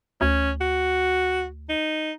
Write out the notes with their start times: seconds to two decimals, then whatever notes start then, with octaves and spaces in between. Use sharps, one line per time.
0.21 D2 C#4
0.61 F#4
1.69 D#4